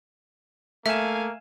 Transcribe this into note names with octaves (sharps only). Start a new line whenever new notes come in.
A3 A#3 E5 F5 G#5 E7